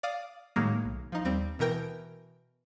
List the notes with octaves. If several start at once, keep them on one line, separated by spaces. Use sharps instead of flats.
D5 F5 D#6
A2 D#3 F#3 G#3 A#3
B1
F3 D#4
D#2 G3 C4
B2 E3 A#4 G5